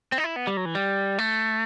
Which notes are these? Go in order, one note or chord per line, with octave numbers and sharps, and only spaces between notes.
C4
D#4
E4
B3
G3
F#3
E3
G3
A3